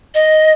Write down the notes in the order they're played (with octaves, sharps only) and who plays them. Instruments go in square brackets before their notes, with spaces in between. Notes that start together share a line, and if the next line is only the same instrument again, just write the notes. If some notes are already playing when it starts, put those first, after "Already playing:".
[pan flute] D#5